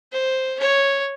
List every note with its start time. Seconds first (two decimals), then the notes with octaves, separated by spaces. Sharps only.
0.12 C5
0.60 C#5